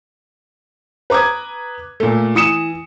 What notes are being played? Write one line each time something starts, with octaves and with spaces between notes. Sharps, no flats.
B4 A#5 D6 D#6 G#6
A#2 A3
E3 D#6 C#7 E7